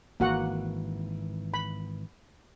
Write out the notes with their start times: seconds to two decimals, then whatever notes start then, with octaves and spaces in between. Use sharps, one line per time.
0.20 G#1 E3 A#3 F#4 F#5
1.54 B5